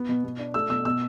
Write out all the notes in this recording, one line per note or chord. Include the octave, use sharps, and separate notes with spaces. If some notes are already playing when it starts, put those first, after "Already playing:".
Already playing: B3
B2
B2
D4
A3 E6
B2 E6
B2 E6